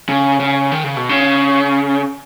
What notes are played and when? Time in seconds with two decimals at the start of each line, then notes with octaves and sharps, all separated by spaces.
0.09 C#3
0.40 C#3
0.72 D#3
0.84 C#3
0.97 B2
1.09 C#3